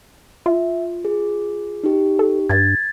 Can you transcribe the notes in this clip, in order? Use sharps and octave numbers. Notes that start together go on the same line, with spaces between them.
F4 E5
G#4
D#4 G4
A4
G2 G#6 A6